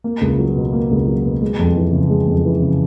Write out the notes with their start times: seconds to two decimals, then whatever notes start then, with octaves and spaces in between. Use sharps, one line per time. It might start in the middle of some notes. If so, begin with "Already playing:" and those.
0.04 A#3
0.21 C#2
0.39 F#3
0.56 B2
0.73 A#3
0.91 C#2
1.07 F#3
1.25 B2
1.42 G#3
1.59 F2
1.76 E3
1.93 C#3
2.10 G#3
2.28 F2
2.45 E3
2.62 C#3